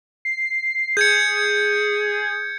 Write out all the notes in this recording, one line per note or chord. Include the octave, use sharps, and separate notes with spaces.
C7
G#4 G6 G#6 C#7